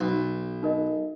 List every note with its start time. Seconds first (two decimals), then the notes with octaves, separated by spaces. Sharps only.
0.01 B1
0.63 D#4 A#4 D#5